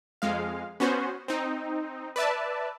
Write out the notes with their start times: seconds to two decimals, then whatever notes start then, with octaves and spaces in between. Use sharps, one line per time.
0.22 F2 G#3 F5
0.80 B3 C#4 F#4 C5
1.28 C4 D#4
2.16 B4 D5 E5 A5